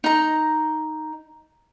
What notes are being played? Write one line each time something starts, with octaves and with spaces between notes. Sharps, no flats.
D#4 A#5